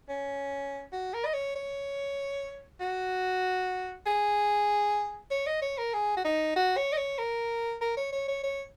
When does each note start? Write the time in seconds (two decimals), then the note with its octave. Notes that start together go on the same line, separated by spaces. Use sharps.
0.09 C#4
0.93 F#4
1.14 A#4
1.25 D#5
1.34 C#5
1.55 C#5
2.80 F#4
4.06 G#4
5.31 C#5
5.47 D#5
5.62 C#5
5.78 A#4
5.94 G#4
6.17 F#4
6.25 D#4
6.56 F#4
6.77 C#5
6.93 D#5
6.98 C#5
7.18 A#4
7.81 A#4
7.97 C#5
8.13 C#5
8.28 C#5
8.44 C#5